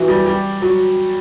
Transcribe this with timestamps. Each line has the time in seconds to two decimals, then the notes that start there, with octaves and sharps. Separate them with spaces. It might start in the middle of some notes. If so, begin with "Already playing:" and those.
Already playing: E3 F#3
0.08 G3
0.26 G3
0.62 F#3